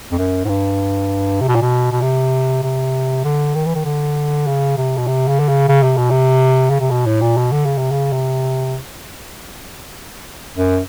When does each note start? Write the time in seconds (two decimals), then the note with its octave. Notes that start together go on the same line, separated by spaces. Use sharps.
0.11 F2
0.19 F#2
0.45 G#2
0.49 G2
1.41 C3
1.48 B2
1.55 A#2
1.62 B2
1.92 B2
2.02 C3
2.63 C3
3.24 D3
3.55 D#3
3.66 E3
3.75 D#3
3.85 D3
4.47 C#3
4.77 C3
4.97 B2
5.07 C3
5.28 C#3
5.39 D3
5.48 C#3
5.68 C#3
5.83 C3
5.97 B2
6.11 C3
6.70 C#3
6.80 C3
6.90 B2
7.06 A2
7.21 A#2
7.37 B2
7.52 D3
7.66 C#3
7.78 C3
7.92 C#3
8.12 C3
10.57 F#2